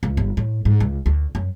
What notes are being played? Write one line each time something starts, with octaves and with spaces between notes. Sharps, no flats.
C#2
G1
A2
G#2
C#2
D2
F#2